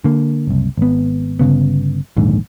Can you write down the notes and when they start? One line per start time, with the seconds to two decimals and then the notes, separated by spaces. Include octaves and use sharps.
0.04 D3 A#3
0.47 F#1 C2
0.78 G#1 B3
1.39 G1 D#2 C#3 B3
2.17 A#1 D#2 G#2 D3